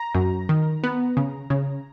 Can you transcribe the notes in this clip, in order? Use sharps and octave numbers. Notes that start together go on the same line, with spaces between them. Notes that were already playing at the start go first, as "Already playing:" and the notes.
Already playing: A#5
F#2
D#3
B3
C#3
C#3